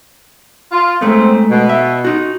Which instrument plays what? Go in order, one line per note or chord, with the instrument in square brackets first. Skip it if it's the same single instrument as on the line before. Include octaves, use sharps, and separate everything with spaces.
[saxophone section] F4
[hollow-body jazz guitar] G#2 A3 B3 [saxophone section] C4
[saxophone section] B2
[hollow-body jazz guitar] E5
D#4 F#4